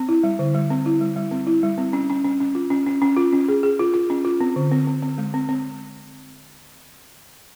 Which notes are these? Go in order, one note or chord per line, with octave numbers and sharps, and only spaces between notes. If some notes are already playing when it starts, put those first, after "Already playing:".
Already playing: C4
E4
G3
D3
G3
C4
E4
G3
G3
C4
E4
G3
C4
C#4
C#4
C#4
C#4
F4
C#4
C#4
C#4
F4
C#4
G#4
G#4
F4
F4
C#4
F4
C4
D3
C4
C4
C4
G#3
C4
C4